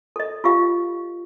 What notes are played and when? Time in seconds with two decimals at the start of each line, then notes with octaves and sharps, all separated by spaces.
0.16 A4 D#5
0.44 F4 G4 F5